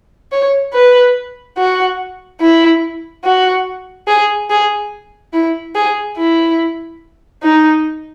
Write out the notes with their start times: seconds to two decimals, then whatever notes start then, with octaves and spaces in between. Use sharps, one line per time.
0.32 C#5
0.73 B4
1.58 F#4
2.41 E4
3.25 F#4
4.08 G#4
4.50 G#4
5.33 E4
5.75 G#4
6.18 E4
7.43 D#4